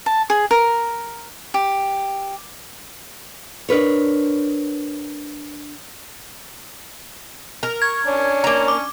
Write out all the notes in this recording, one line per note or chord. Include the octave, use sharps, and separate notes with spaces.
A5
G#4
A#4
G4
D4 A#4 B4 C#5
A#4
C#6 G#6
C#4 D4 C#5
A#3 A#5
D6